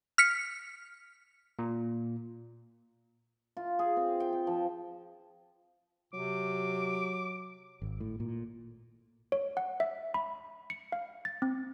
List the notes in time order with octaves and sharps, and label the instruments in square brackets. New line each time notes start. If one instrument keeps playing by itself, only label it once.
[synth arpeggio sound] F6 B6 C#7
[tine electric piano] A#2
[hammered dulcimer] F4
G#4
C4
G5
G5
F3
[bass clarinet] C3 [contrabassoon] F#3 [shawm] D6
[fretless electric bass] G#1
A2
A#2
[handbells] C#5
F#5
E5
B5
C#7
F5
A6
C4